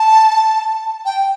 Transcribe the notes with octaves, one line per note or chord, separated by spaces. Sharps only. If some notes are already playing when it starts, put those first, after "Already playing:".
Already playing: A5
G5